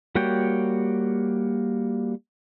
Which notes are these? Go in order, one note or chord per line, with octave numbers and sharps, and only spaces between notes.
G3 A#3 F#4 C#5 G5